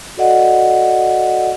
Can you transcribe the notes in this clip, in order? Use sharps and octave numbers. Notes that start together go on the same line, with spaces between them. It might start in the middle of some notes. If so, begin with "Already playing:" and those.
F#4 A4 D5 D#5 F#5